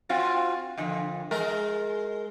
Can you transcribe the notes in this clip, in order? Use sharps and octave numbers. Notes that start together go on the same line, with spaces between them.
C4 F4 F#4
F2 D3
G#3 A#4